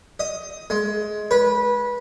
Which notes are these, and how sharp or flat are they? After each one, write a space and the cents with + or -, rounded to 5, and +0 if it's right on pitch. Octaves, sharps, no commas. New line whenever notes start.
D#5 +15
G#3 +20
B4 -20